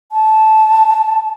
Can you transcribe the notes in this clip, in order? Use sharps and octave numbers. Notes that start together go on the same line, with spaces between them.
A5